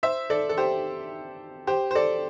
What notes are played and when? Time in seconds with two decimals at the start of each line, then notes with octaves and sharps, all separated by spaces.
0.03 C5 E5
0.30 A4 D5
0.49 A4
0.57 G4 C5
1.67 G4 C5
1.91 C5
1.95 A4 D5